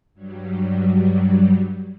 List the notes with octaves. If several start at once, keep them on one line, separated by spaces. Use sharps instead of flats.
G2 F#3 G3